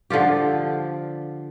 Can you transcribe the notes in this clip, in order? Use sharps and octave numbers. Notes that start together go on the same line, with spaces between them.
D3 F3 F4 G4